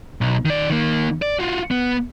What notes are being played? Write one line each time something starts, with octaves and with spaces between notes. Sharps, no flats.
B1
D#3 D5
D#3 A#3
D5
F4 F#4
B3